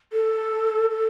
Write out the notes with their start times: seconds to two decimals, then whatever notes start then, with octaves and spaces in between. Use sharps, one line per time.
0.13 A4
0.90 A4